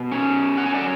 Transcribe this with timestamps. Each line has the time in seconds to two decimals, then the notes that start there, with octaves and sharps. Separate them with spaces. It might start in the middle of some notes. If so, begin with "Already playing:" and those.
Already playing: B2
0.12 C#4
0.58 F#3 F#5
0.66 G#5
0.74 D5 F#5